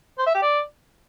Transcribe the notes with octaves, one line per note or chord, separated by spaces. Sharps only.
C5
E5
G4
D5